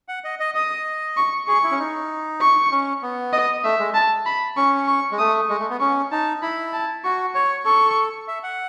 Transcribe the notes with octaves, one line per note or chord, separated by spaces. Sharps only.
F#5
D#5
D#5
D#5 D#6
C#6
G#4 C#6
E4
C#4
D#4
C#6
C#4
B3
D#5
A3 E5
G#3
A5
B5
C#4 C#6
C#6
G#3
A3 D#6
G#3 C#6
A3
B3
C#4 C#6
D#4 A5
E4 B5
A5
F#4 C#6
C#5 C#6
A4 C#6
E5
F#5